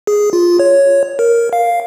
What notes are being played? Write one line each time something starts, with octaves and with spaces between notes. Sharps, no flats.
G#4
F4
C#5
A#4
F5